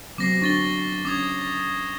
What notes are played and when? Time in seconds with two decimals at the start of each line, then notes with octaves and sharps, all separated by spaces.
0.18 F#3 B3 C4 D6 A#6 C7
0.42 D4 C#6 A6 G7
1.05 C#4 D6 D#6 G#6